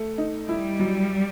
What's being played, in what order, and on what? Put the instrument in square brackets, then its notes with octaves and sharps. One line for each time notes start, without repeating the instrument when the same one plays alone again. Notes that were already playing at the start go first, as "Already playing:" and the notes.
Already playing: [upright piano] A3
D#4
[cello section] G3 [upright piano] E4
[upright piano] F#3